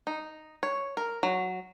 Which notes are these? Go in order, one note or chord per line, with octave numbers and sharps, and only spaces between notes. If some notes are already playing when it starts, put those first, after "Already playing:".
D#4
C#5
A#4
F#3